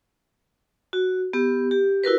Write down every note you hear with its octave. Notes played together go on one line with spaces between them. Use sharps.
F#4
B3 G4
G4
E4 F#4 A#4 B4